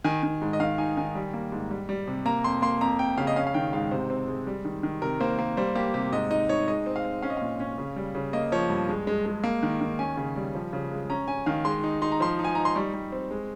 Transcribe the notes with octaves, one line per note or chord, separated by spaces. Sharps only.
D#3 G#5
D#3
G#2
D#5
D#3 F5
D#4 G#5
D#3 G#5
G3
A#3
G#2
G3
G3
C3
A#3 A#5
F2 C6
A#3 C6
F2 A#5
F2 G5
C#3 F5
D#5
C#4 F5
F5
D#3 G5
G#2 F5
C3 C5
C4
G#3
G3
D#3
D#3
C3 A#4
A#3 C5
A#3
G3 C5
A#3 G4
C3 G4
G#2 D#5
D#4 D#5
D#4 C#5
G#3 D#5
C4
F5
C4
C#4 F5
D#5
A#2 F5
C#4
C#3
G3
C#3
A#3 D#5
F3 C#5
G2
G#3
G#3
G#3
A#3
D#3
D#3
C#4 G#5
C#3
G3
F3
C#3
G#3
C#4 A#5
C#4 G#5
D#3 F5
G#3 C6
D#4
D#4 C6
A#5
F3 C6
D#4
G#5
D#4 A#5
C6
G3 C#6
G3
C4
G#3